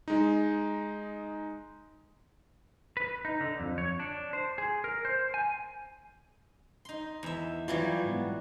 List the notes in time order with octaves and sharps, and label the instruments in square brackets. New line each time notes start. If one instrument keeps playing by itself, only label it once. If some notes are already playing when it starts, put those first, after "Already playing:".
[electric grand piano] G#3 D#4
[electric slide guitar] B4
D#4
D3
F2
C#5
D4
C5
G#4
A#4
C5
G#5
[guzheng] D#4 C6
E2 E5
[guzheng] E3 F#3 G3 [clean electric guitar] F4
[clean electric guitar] G#2 B3